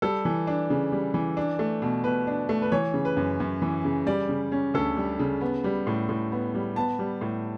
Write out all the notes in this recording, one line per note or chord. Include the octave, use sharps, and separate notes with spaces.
G3 A4
E3
D4
C#3
G3
E3
D4
A3
B2
B2 B4
D4
A3
B4
E3 C#5
C#3
B4
F#2
F#2
E3
C#3
G3 D5
C#3
C#4
D2 A4
G3
C#3
B3
G3
A2
A2
B3
G3
B3 A5
G3
A2